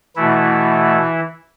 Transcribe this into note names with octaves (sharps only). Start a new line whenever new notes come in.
B2 E3 A3 E4